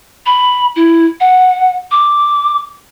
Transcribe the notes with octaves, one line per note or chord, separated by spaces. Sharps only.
B5
E4
F#5
D6